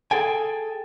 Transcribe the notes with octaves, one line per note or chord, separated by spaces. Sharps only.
G#4 A4 G5 G#5